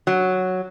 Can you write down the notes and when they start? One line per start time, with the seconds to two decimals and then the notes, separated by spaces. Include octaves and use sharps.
0.07 F#3